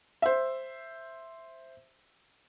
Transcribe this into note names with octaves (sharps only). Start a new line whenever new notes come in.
C5 E5